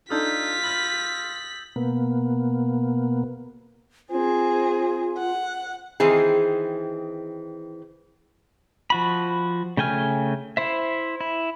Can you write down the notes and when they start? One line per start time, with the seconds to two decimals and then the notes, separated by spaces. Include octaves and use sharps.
0.10 D4 D#4 F4 A4 D#6 E6 G6 B6
0.63 B5 E6 F6 A6 F#7
1.76 B2 A#3 B3
4.10 C4 F4 G#4
5.17 F#5
6.00 D#3 E3 C4 G#4
8.90 F3 F#4 B5
9.77 C#3 A3 G5 G#5 F6
10.57 E4 C5 E5
11.21 E4